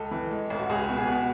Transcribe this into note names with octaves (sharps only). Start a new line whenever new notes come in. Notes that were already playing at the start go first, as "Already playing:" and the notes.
Already playing: C#2 A4
E3
G#3
A1
F#4
C#2 G#4
B2
G#4
B2 F#4